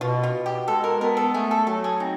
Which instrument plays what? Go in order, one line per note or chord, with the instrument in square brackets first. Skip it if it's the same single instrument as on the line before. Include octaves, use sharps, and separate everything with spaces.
[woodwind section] B2 [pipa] F4
[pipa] F4
[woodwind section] B2
[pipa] G4
[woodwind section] G#3 [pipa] A4
[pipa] A#4
[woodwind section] B3 [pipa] A#4
[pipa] A4
[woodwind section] A3 [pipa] G#4
[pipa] A4
[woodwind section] F#3 [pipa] A4
[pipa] G#4
[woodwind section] C4 [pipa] D#4